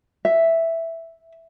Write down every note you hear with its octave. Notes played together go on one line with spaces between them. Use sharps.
E5